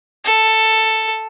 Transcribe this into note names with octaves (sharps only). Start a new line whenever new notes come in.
A4